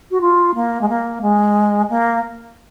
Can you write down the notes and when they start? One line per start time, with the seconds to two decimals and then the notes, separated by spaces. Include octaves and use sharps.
0.11 F#4
0.21 F4
0.55 A#3
0.81 G#3
0.89 A#3
1.22 G#3
1.89 A#3